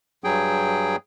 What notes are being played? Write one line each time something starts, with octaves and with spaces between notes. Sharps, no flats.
G2 F#3 G#4 G5